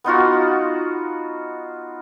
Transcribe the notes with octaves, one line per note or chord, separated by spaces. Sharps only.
B3 D#4 F4 F#4